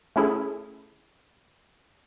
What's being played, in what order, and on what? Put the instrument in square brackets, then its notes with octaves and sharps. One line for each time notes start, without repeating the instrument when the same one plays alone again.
[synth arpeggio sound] A3 C#4 E4 G#4 A4